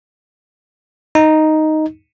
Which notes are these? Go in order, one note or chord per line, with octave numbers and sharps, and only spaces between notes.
D#4